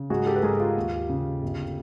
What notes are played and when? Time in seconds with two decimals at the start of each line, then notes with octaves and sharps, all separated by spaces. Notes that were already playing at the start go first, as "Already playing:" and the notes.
Already playing: C#3
0.10 G#2 F#4 G#4
0.26 G4 A4
0.36 B4
0.43 G#2 G#4 A#4
0.60 F4 G4
0.76 D#2
1.09 C#3
1.43 G1